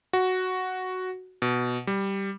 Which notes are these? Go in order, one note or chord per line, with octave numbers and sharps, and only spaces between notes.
F#4
B2
G3